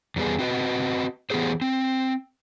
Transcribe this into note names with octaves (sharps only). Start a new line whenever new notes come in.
E2 G3 B3 G#4
C4 F#4 B4 D#5
E3 B3 C4 G4 G#4 C5
C4